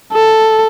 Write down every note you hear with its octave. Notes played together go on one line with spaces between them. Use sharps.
A4